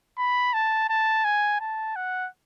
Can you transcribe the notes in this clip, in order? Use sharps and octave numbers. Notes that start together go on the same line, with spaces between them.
B5
A5
A5
G#5
A5
F#5